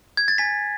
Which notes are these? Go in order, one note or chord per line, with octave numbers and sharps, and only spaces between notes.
G#6
A6
G#5 B6